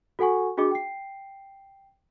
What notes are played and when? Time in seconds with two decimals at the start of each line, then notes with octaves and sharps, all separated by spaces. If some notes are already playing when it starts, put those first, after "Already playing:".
0.19 F#4 A4 F#5 G#5 C#6
0.57 D4 F#4 G#4 D#5 D6
0.71 G5 C7